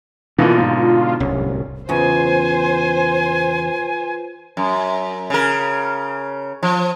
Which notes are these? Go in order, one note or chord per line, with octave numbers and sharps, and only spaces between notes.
B2 D3 E3 A#3 F4
G#2
D1 C2 C#4
E2 C#3 F4 B4 C5 G#5
F#2
C#3 A#4
F3